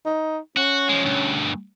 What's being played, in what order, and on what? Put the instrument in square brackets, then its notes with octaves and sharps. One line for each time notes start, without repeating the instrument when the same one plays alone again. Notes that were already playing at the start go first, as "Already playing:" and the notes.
[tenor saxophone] D#4
[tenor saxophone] C#4 [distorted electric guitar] F#4
[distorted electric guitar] F3 G#3
D2 G2